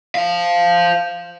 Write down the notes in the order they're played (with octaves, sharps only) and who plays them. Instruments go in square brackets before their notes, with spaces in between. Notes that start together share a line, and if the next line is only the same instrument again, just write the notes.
[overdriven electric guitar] C5 F5